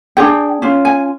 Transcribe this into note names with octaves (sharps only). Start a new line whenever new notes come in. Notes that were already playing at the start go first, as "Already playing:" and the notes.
D4 F4 G#4 G5
C#4 F4
G#5